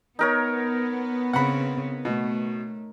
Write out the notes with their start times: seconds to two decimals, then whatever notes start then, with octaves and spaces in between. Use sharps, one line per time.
0.19 B3 D#4 A#4 C#5
1.33 C#3 C4 F#5 B5
2.05 B2 A3